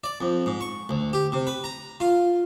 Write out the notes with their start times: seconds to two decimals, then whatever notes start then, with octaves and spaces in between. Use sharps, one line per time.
0.04 D5
0.21 F2
0.46 G#2
0.61 C#6
0.89 D2
1.13 G4
1.32 C3
1.47 B4
1.64 A#5
2.00 F4